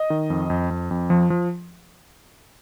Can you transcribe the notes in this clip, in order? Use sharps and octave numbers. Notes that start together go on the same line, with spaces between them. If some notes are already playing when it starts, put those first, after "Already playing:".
Already playing: D#5
D#3
F2
F2
F2
F2
F3
F3